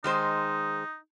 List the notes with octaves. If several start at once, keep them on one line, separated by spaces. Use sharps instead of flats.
D#3 G#3 D#4 C5